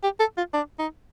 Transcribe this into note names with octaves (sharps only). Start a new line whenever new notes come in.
G4
A4
F4
D4
D#4